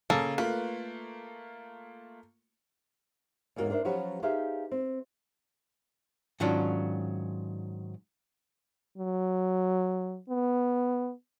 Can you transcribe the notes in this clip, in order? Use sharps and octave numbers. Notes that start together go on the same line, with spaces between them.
C#3 A#3 C#4 A4
A3 A#3 F4 B4
E2 G#2 A#3 F#4 A#4 C#5
D4 A#4 C5 E5
F3 F#3 C#4 F#4 G4 B4
D#4 G4 G#4 C5 E5 F5
C4
G#2 D#3 F#3 C#4 D4 F4
F#3
B3